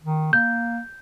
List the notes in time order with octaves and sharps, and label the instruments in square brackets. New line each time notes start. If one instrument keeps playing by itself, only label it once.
[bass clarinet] D#3
[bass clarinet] A#3 [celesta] G6